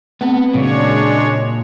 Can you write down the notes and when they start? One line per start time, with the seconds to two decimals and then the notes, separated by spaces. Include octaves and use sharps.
0.21 A3 B3 C4
0.53 A#2 C#3 F#3 G#3 D4 C#5